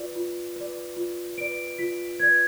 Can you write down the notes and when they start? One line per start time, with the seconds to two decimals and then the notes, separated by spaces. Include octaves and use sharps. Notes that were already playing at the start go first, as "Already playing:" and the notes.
Already playing: F4 B4 D5
0.15 F4
0.56 B4 D5
0.96 F4
1.38 B4 D5 D7
1.78 F4 B6
2.19 B4 D5 G#6